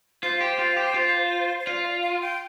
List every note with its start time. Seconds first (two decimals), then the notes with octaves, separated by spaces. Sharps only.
0.23 F4 C5
0.41 G4
0.59 F4
0.77 G4
0.94 F4
1.60 C5
1.66 F4 D5
1.85 F5
2.03 F5
2.21 G5